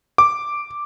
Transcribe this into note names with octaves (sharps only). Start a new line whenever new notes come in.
D6